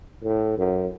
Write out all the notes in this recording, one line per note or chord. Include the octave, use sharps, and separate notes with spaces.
A2
F#2